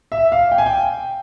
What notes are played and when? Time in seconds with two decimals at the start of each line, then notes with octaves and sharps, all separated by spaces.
0.12 E5
0.32 F5
0.52 G5
0.58 G#5
0.66 G5